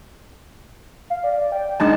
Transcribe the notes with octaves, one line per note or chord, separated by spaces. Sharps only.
F5
D5
G5
G#3 D4 D#4 A5